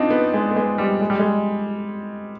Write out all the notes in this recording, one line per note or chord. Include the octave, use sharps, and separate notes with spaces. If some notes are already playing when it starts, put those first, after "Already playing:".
Already playing: C4 D4 D#4 F4
B3
G#3
B3
G#3
G3
G#3
G3
G#3